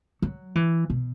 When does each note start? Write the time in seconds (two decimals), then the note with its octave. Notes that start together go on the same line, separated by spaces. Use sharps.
0.22 F#3
0.55 E3
0.90 B2